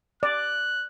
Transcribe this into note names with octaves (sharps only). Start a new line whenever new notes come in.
D5 F#6